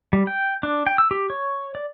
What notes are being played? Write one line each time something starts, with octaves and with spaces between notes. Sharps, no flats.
G3
G5
D4
G5
E6
G4
C#5
D5